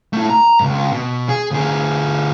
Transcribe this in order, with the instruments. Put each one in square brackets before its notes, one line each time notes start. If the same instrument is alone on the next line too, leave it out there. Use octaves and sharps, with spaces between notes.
[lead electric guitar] A3 E4
A#5
C#2 G2
B2
G#4
D2 G#4